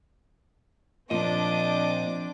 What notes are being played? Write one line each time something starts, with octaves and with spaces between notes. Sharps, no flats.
A#2 F3 C4 D4 D#5 D6